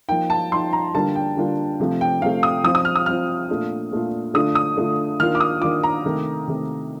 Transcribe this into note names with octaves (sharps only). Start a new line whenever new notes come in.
F3 A#3 D#4 G5
A5
F3 A#3 D#4 C6
A#5
D3 G3 A#3 D4 F4 A5
G5
D3 G3 A#3 D4 F4
C3 F3 A3
G5
C3 F3 A3 F5
D#6
F3 C4 F4 D#6
D#6
F6
D#6
F3 C4 F4 F6
A#2 A3 D4 F4
A#2 A3 D4 F4
D3 A3 D4 F4 D#6
D#6
D3 A3 D4 F4
D#3 A#3 D4 F4 F6
D6
D#6
D#3 A#3 D4 F4 D6
A#5
C3 D#3 A3
C3 D#3 A3